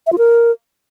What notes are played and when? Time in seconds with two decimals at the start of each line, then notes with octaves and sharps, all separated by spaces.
0.07 E5
0.12 F4
0.18 A#4